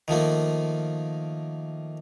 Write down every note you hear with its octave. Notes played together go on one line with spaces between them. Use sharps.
D#3 F3 A3 A#3